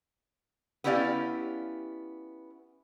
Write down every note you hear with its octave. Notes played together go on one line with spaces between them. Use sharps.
B3 C#4 E4 G4 D5 F5